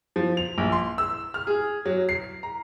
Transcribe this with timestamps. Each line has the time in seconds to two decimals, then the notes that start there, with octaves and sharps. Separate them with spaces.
0.16 F3
0.37 F7
0.58 A#1
0.72 C6
0.98 E6
1.34 F6
1.47 G#4
1.86 F#3
2.09 C7
2.43 A#5